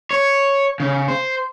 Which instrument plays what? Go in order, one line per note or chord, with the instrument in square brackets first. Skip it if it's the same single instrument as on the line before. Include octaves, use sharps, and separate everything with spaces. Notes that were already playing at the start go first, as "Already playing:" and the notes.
[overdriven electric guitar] C#5
C#3
C5